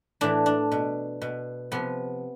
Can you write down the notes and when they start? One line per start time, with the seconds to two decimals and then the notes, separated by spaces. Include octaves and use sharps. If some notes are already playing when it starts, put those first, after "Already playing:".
0.21 A2 E3 D4
0.46 D4
0.71 B2
1.22 B2
1.72 C3 F3 B3